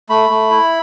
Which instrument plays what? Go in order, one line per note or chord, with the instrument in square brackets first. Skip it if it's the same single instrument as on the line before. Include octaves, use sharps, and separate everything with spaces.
[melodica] A3 B5
A3
E4